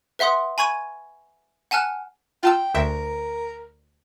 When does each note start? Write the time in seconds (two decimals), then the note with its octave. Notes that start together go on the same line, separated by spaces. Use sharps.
0.19 B4 E5 F#5 C6 D#6
0.58 G#5 B5 C#6 G#6 D#7
1.71 F#5 G#5 A5 F6 F#6
2.43 F4 G5 A5 E6
2.74 D2 A#4 E5 G5